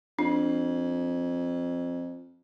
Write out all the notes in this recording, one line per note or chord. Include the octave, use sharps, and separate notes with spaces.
F2 D4